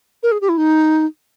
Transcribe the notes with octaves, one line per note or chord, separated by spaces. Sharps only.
A#4
G#4
G4
E4
D#4